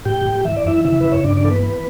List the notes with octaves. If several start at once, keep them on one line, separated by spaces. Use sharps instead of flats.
A2 G4 G5
A2
E3 E5
D5
F#2 E4 E5
C#3 E4 E5
C#3 B4
C#5
G2 D4 D5
D4 D5
E3 A4
B3 B4
B3